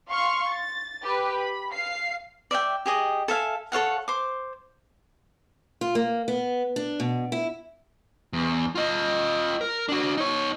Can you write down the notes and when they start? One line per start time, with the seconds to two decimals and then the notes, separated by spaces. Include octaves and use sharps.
0.11 F5 C6 C#6 F6
0.48 A6
1.04 G4 B4
1.36 B5
1.73 F5 C7
2.51 D5 E5 F5 G5
2.86 G4 G#4 D#5
3.28 A4 E5 F5 G#5
3.72 A4 C#5 F5 F#5
4.08 C5 D6
5.81 F4
5.95 A#3
6.28 B3
6.76 D4
7.00 B2
7.32 E4
8.33 E2
8.75 F4 D#5
9.61 A#4
9.89 D4 F#4
10.17 D#4 C#5